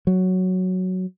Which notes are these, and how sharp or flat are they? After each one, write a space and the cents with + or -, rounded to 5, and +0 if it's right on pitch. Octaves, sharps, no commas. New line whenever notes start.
F#3 +0